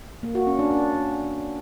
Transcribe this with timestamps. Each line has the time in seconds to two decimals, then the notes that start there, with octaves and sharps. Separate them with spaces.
0.23 A#3
0.35 F#4
0.47 C#4
0.59 D4
0.71 D4